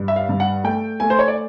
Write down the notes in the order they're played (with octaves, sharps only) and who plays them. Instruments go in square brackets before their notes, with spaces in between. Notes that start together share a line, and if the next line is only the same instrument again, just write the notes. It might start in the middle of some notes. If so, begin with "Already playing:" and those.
Already playing: [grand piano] G2
E5
F5
G2
F#5
A3 G5
A3 G#5
C5
C#5
D5